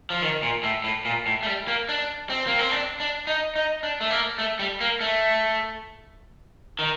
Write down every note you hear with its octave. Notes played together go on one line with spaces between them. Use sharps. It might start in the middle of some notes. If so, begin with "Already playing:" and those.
F3
D#3
A#2
A2
A2
A#2
A2
A3
G3
A#3
D4
C4
A#3
C4
D4
D4
D#4
D#4
D4
A3
A#3
A3
G3
A#3
A3
D#3